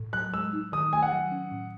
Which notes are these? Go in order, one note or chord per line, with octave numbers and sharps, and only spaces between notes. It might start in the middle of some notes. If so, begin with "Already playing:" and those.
Already playing: A2
F#3 F#6
G#3 E6
D#4
D#3 D#6
A3 G#5
F#5
F#3
C#4
A2